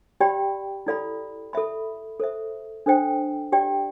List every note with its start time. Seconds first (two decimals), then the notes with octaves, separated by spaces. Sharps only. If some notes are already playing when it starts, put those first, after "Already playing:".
0.20 G4 D5 G5 B5
0.87 E4 A4 D5 F5 B5
1.53 A4 E5 B5
2.20 A4 C5 E5
2.86 D4 A4 C5 G5
3.52 G4 D5 G5